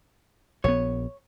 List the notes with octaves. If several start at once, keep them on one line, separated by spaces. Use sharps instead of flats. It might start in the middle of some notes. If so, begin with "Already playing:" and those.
A#1 B3 C#5